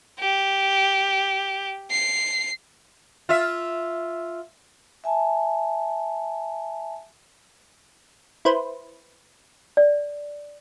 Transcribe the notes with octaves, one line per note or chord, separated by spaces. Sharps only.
G4
C7
F4 E5
E5 G#5 A5
E4 B4 C5
D5